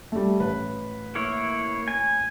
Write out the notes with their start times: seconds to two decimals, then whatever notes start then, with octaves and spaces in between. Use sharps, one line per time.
0.12 G3 A3
0.40 A1 B4
1.15 A#3 E4 C#5
1.88 G#5